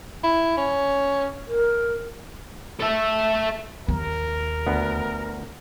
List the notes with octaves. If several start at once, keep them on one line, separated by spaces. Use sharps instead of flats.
E4
C#4
A#4
A4 E5
D#2 A#4
D2 B3 F#5